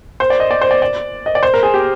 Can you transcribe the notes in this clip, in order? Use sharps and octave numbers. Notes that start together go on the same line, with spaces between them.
C5
D5
D#5
D5
C5
D5
D5
D#5
D5
C5
A#4
G#4
G4